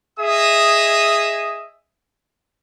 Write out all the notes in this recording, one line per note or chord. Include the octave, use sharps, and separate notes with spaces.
G#4 D#5 E5 D#6